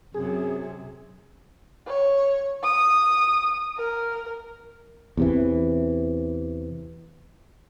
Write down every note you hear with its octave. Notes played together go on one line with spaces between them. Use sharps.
F#2 C3 G#4
C#5
D#6
A#4
E2 C3 E3